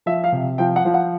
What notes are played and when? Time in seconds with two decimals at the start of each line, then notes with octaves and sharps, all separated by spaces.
0.06 F3 E5
0.24 F5
0.32 C3
0.58 F3 G5
0.76 F#5
0.85 F3
0.94 F#5